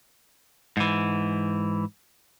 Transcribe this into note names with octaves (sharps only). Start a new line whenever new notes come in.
G#2 E3